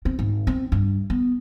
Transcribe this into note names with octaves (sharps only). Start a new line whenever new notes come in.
C4
G#1
C4
G2
B3